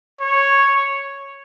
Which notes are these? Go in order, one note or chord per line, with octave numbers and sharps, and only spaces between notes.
C#5